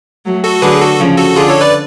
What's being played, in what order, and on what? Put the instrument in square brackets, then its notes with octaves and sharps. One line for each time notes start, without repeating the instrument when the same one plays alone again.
[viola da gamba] F#3 A3
[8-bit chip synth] F#4 A4
[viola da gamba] D3 F#3 [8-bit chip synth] G#4 B4
[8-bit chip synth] F#4 A4
[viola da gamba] C#3 F3
[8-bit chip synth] F#4 A4
[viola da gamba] D3 [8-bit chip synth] F4 G#4
[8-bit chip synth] A4 C#5
B4 D5